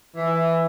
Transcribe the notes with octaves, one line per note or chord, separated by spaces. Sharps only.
E3